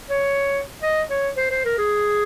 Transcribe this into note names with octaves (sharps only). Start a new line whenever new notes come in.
C#5
D#5
C#5
C5
C5
A#4
G#4